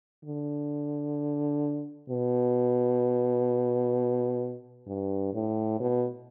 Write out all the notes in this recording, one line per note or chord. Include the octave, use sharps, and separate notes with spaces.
D3
B2
G2
A2
B2